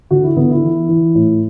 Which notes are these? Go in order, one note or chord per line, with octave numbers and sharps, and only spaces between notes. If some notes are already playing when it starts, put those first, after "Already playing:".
D3 F#4
E4
D3 B3
E4
E3
E3
A2